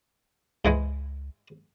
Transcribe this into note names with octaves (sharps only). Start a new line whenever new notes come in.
C#2 G#2 E3 G#3